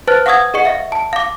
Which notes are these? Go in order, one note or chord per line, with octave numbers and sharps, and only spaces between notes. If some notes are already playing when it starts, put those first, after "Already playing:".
B4 C5 A5 F6 F#6 A6
F5 F#5 C#6 D#6 E6 G#6
G#4 D#5 F#5 C#6 C#7
E5 F5
A5
F5 D6